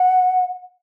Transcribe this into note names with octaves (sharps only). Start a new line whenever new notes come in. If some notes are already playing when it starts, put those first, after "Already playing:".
Already playing: F#5